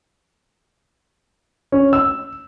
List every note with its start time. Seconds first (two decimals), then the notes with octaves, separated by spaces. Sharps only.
1.72 C#4
1.93 E6